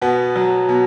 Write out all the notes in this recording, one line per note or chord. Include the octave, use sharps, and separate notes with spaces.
B2 B3
F#3
B2